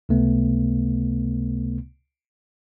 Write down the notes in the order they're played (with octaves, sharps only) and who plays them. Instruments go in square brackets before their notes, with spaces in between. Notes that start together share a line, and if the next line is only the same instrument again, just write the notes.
[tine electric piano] C#2 C3 A3 B3